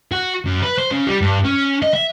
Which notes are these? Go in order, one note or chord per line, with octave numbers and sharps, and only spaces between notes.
F#4
F#2
B4
C5
C#3
G3
G2
C#4
D#5
E5